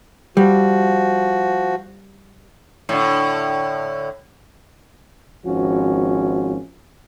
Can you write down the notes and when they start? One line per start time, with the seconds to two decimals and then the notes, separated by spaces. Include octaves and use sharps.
0.37 F3 G3 F#4
2.89 A2 D3
5.45 G#1 F3 C#4 F#4